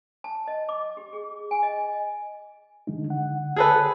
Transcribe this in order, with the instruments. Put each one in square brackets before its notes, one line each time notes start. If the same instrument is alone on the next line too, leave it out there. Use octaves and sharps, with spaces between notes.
[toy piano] A5
D#5
D6
G4
G#4
G#5
D#5
[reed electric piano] D3 G#3 D#4
D3 F#5
[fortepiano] G#4 A4 B4